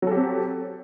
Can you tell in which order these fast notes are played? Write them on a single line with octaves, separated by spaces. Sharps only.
F#3 A4 G4 C4